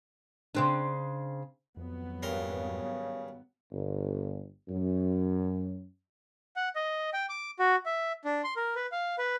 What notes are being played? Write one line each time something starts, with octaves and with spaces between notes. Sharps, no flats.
C#3 C4 D4
G#1 F2 F#3 B3
G2 C#3 A#4 C6
G1
F#2
F#5
D#5
G5
D6
F#4
E5
D4
C6
A#4
B4
F5
B4